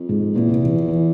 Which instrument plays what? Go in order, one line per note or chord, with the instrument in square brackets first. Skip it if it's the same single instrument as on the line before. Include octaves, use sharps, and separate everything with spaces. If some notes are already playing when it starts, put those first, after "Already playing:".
Already playing: [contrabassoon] F2
[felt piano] G#2
[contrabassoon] E2 [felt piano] A#2
[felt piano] C3
E3
F3
E3